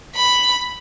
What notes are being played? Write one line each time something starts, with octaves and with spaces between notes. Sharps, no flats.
B5